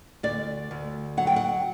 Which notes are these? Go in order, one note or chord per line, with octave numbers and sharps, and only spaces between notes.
D2 D5
D2
F#3 F#5
G5
F#5